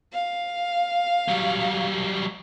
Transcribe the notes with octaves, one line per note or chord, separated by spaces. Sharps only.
F5
F#3 G3